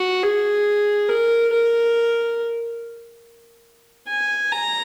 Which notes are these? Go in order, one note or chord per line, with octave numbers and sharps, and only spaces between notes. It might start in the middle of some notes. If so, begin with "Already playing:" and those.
Already playing: F#4
G#4
A#4
A#4
G#5
A#5